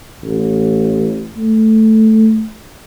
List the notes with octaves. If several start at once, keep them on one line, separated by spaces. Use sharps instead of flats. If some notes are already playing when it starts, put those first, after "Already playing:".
A1
A3